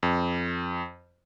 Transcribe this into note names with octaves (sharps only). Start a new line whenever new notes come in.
F2